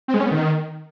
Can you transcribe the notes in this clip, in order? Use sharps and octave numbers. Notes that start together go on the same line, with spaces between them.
C4
G#3
C#4
B3
D#3